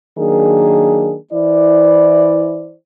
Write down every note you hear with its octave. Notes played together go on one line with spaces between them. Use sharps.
D#3 F#3 A#3 D4 G#4
E3 E4 C5 D5